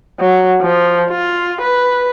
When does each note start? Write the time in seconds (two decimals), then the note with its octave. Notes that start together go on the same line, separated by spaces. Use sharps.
0.20 F#3
0.62 F3
1.11 F4
1.62 B4